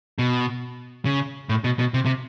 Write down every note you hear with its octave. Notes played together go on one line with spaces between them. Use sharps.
B2
C#3
A2
B2
B2
C3
C3